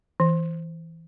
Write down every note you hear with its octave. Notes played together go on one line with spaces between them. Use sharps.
E3